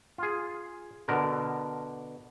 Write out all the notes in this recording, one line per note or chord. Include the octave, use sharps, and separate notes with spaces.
F4 G#4
B2 D3 A#4